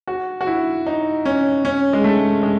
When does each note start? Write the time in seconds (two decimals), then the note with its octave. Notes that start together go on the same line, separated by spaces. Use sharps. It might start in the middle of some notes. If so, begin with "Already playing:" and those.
0.07 F#4
0.41 F#4
0.47 E4
0.86 D#4
1.25 C#4
1.65 C#4
1.93 G#3
2.04 A3
2.43 G#3